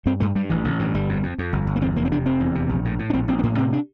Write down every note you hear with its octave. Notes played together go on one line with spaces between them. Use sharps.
G2 C4
G2 A3
G2 G3
A1 E3
A1 D3
G2 E3
G1 G3
F2
F2
F2
G1
G1
A#3
E2 C4
F1 A#3
C4
C3 D4
F1 C4
E2
C3
A#1
A2
A2
D4
A#1 C4
A#1 C4
C4
A2 A#3
C3 C4
D4